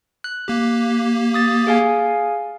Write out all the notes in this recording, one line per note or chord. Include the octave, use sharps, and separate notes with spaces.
F#6
A#3 G4
D#6 A6
G#4 F5 G#5